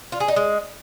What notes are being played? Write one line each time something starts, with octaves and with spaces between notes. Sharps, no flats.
F4
G#4
D#4
G#3